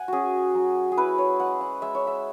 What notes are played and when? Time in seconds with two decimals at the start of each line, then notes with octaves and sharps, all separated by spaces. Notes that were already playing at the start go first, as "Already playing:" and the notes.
Already playing: F#5 G#5
0.08 C#4 F#4 G#4
0.55 F#3
0.92 G#4
0.97 E4 B4
1.18 C#5
1.40 G#3 F#5
1.61 F#5
1.82 G#3 E5
1.95 C#5
2.07 E5